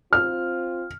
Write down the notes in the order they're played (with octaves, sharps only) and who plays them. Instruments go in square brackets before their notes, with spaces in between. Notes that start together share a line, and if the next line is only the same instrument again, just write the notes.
[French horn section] C4 F4 [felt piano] F6